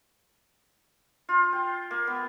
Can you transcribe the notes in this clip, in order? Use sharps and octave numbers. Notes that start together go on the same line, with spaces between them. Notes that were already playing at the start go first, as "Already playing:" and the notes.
F4
G5
A#3
B3